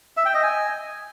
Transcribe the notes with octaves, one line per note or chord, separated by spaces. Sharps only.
E5
G5
D#5
G#5